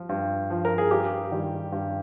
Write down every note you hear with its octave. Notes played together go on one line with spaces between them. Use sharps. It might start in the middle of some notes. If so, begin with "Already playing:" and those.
Already playing: F3
G2
F3
A#4
G#4
G2 G4
D#3 G3
G2